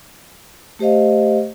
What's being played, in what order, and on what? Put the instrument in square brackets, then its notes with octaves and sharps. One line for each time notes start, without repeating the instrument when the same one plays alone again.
[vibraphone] A3 G4 C5 D#5 F5